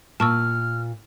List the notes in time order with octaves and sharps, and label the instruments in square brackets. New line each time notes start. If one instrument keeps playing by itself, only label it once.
[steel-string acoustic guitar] A#2 [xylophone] A5 C#6 E6 [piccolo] F6